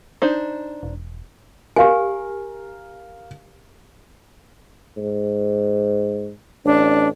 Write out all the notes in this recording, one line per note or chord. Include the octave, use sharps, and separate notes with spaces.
D4 D#4 C5
E1
G4 A#4 F5 G#5
G#2
A1 D4